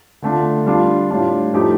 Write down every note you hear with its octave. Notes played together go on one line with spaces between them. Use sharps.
D3 A3 D4 F4
G3 D4 F4
A2 G3 D4 F4
A2 F3 A3 D#4 G4